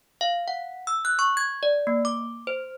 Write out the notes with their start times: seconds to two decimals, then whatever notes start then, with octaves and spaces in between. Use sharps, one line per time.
0.21 F5
0.48 F#5
0.87 E6
1.05 F#6
1.19 C#6
1.37 G#6
1.63 D5
1.87 A#3
2.05 D6
2.47 C5